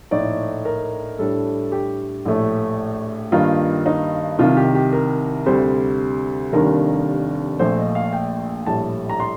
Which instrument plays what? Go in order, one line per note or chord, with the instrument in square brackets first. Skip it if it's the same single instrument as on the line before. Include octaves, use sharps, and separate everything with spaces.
[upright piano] A#1 A2 A3 D#4 D5
A#4
A2 G3 D4 A4
G4
A#1 A2 A3
G2 D#3 G3 A#3 D#4 F4
D#4
C2 C3 D#3 F4
G4
G4
A#4
D2 C3 G3 C5
F1 D#2 D#3 G3 D4 A#4
A#1 A#2 F3 A3 C5
D#5
F5
G5
A#1 A2 G3 A5
A#5
C6